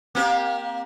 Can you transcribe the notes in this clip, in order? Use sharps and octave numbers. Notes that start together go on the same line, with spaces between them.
A#3 C4 G4